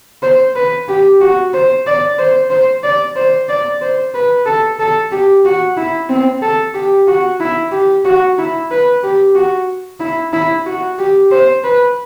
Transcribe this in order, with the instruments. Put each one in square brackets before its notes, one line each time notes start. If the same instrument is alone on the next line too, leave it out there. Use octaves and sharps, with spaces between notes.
[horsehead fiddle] C5
B4
G4
F#4
C5
D5
C5
C5
D5
C5
D5
C5
B4
A4
A4
G4
F#4
E4
C4
A4
G4
F#4
E4
G4
F#4
E4
B4
G4
F#4
E4
E4
F#4
G4
C5
B4